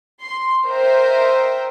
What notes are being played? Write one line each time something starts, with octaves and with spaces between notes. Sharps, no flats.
C6
A#4 C5 D#5 E5 G5